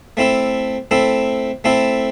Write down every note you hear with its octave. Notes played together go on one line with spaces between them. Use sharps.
A3 C4 E4 A4
A3 C4 E4 A4
A3 C4 E4 A4